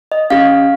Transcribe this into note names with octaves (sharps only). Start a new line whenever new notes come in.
D#5
C#4 G4 F5